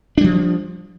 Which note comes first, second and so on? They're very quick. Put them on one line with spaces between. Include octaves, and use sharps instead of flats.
D4 G3 F3